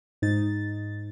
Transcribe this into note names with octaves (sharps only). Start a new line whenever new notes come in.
G#2 D#4 A6